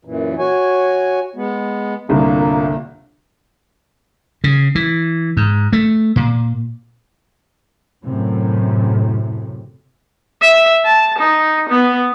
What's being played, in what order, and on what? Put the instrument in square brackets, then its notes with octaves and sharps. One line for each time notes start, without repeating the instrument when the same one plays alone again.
[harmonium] F#2 A#2 E3
F#4 C#5 G#5
G#3 B3
[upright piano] G1 C2 G2 [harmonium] A#2 A#3
[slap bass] C#3
E3
G#2
A3
A#2
[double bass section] F#2 A2 C3
[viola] E5
A5
D#4
B3